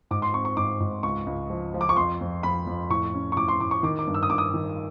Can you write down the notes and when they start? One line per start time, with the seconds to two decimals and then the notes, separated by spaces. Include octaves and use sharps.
0.11 G#2 D6
0.22 C6
0.34 C4 C#6
0.45 C#6
0.57 G#2 D6
0.80 G#2
1.03 C#2 C#6
1.27 C#2
1.50 F3
1.74 F3
1.81 D6
1.89 C#6
1.96 F2 C6
2.21 F2
2.43 F2 B5
2.67 F2
2.90 A2 C#6
3.14 C#4
3.32 C#6
3.37 A2 D6
3.48 C6
3.60 A2 D6
3.71 C#6
3.83 D#3 D6
3.99 D6
4.07 G2
4.14 E6
4.23 D#6
4.30 G2 D6
4.38 D#6
4.54 D#3